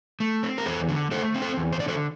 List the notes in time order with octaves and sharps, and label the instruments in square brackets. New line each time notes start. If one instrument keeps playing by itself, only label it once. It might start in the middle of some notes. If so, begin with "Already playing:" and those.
[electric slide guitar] A3
C4
A#4
E2 A4 C5
D3
A3 A4 C5
C4
A4 C5
E2
C5
D3 D5
A4 C5